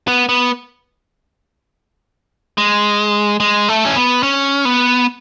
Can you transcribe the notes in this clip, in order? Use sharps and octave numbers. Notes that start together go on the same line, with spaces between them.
B3
B3
G#3
G#3
A3
C#4
B3
C#4
B3